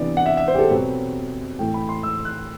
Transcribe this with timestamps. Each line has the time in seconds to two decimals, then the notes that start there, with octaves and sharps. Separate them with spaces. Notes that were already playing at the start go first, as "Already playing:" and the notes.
Already playing: C3 E3 B3 D4 D5
0.17 F#5
0.26 E5
0.37 E5
0.48 C5
0.55 G4
0.59 A4
0.70 B2 F#3 C4 B4
1.59 A2 E3 A3 G5
1.74 B5
1.89 C6
2.03 E6
2.25 F#6